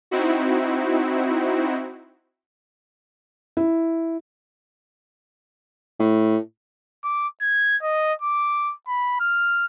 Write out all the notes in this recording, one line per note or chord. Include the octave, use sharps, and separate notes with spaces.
C4 D#4 E4 F#4
E4
A2
D6
G#6
D#5
D6
B5
F6